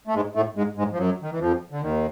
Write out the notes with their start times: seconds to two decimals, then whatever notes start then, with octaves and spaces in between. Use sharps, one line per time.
0.07 A3
0.15 G#2 G#3
0.35 A2 A3
0.56 G#2 G#3
0.77 G#2 G#3
0.92 F3
0.98 F#2 F#3
1.22 D#3
1.31 E3
1.40 F2 F3
1.71 D3
1.81 D#2 D#3